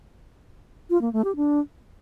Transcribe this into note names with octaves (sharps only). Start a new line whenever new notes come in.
F4
A#3
A3
G4
D4